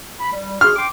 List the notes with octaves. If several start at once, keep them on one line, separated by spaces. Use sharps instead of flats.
B5
G3
F#4 G#4 C6 F6
G5 C6 D6